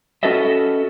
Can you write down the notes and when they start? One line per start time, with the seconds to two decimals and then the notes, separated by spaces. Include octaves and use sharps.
0.23 C#4 F#4 A4 B4 D#5 E5